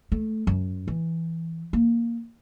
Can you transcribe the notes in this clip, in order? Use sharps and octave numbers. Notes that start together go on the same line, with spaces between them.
A3
F#2
E3
A#3